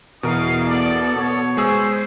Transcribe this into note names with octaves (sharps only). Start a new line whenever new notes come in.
E2 B2 A#4 D#5 F5
B3 A4 D5
B2 C#5
G#3 G#4 C5 E6